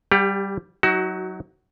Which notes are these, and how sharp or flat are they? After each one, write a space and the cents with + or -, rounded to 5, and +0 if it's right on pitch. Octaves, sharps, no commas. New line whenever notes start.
G3 -5 G4 +25 F#5 +0
F#3 +0 D#4 +45 F#4 +20